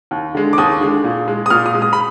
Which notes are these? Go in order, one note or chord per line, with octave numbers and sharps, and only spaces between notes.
D#2
D3 G#3
D6
D#2 D#6
D3 G#3
A#2
G#3
D#6
A#2 F6
D#6
G#3
D#6
B5